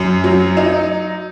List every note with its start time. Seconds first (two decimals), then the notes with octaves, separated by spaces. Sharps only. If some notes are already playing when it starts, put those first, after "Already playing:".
Already playing: F#2
0.24 F#3
0.57 D#4